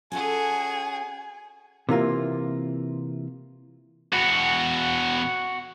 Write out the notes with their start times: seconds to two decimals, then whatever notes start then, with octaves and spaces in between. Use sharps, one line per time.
0.12 C#4 F4 F#4 G#4 A4 G#5
1.89 C3 E3 A#3 F4
4.13 E2 B2 F#4